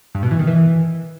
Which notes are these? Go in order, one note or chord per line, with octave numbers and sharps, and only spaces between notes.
G2
B2
E3
D#3
E3